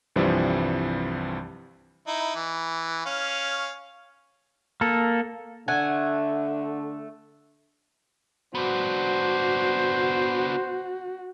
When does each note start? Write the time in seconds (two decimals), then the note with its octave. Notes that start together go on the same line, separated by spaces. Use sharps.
0.16 C2 G2 E3 F3 G3 C4
2.07 D#4 E4
2.36 E3
3.06 C#4 C#5 F5
4.81 A#3 A4
5.68 D3 A3 F#5 G#5
8.55 B3 D4 F#4 C5